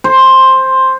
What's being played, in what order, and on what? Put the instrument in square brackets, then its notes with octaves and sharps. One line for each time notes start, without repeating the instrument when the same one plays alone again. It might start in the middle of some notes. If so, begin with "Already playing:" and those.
[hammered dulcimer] C5